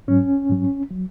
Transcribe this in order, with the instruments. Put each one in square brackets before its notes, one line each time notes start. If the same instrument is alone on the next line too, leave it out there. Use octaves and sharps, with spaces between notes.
[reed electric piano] G#2 F#3 C#4
G#2 F#3
F#3